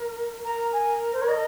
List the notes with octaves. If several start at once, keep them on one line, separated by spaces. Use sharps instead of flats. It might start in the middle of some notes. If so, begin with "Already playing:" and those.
Already playing: A#4
A#4 A#5
G#5
C5
C#5
D#5